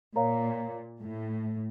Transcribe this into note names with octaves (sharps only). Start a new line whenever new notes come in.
A#2 A#4 C#5 F5 A#5
A2